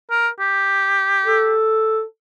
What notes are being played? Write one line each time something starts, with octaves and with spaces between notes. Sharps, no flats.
A#4
G4
A4